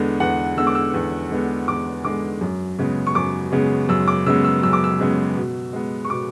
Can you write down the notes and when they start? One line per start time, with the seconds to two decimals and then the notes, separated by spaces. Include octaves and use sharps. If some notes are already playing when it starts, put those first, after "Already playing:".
Already playing: E2 D3 G#3 B3
0.20 E2 F#5
0.57 D3 G#3 B3 E6
0.67 D6
0.75 E6
0.94 E2
1.31 D3 G#3 B3
1.68 E2 D6
2.05 D3 G#3 B3 D6
2.41 F#2
2.79 C#3 G#3 B3
3.07 C#6
3.15 F#2 D6
3.52 C#3 G#3 B3
3.89 F#2 E6
4.08 D6
4.26 C#3 G#3 B3 E6
4.45 E6
4.63 F#2 E6
4.73 D6
4.84 E6
5.00 C#3 G#3 B3
5.37 B2
5.73 G#3 B3
6.05 C#6
6.10 B2 D6